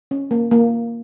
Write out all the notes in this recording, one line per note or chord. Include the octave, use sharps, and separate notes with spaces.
C#4
A#3
A#3